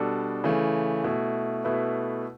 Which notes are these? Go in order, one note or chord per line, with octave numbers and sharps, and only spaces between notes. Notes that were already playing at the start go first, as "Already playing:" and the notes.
Already playing: B2 G3 D4 A4
C#3 E3 A3
B2 A3 E4
B2 A3 E4 B4